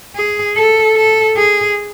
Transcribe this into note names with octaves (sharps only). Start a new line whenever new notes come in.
G#4
A4
A4
G#4